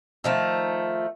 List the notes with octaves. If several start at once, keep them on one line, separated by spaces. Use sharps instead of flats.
D#3 F3 A3